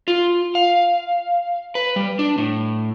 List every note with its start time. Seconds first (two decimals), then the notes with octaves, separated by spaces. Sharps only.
0.08 F4
0.55 F5
1.75 B4
1.96 G3
2.19 D4
2.38 A2